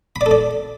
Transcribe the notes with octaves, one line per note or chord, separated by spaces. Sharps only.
B5
D5
A4
D5